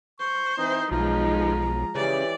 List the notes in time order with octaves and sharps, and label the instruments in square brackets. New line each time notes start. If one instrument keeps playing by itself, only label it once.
[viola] C5 [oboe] C#6
[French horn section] E3 C4 [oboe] D#4
[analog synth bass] B1 [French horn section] B2 D#4 [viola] F3 G#3 [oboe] A#5
[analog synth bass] C#3 [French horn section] E3 G4 C#5 [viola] D5